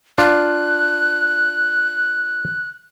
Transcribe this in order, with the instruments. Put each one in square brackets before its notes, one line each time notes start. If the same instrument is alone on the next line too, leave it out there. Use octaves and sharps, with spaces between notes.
[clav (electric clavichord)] D4 F4 [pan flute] F#6